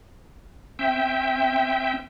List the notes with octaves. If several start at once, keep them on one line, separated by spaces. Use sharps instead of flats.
C4 E5 G5